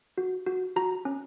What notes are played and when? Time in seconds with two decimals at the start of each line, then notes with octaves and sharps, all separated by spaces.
0.18 F#4
0.46 F#4
0.76 F#4 A#5
1.05 C#4